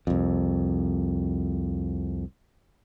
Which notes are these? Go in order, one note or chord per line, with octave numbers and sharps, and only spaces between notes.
C2 F2